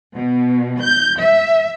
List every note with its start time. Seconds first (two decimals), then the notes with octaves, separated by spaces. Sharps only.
0.16 B2
0.81 G6
1.20 E5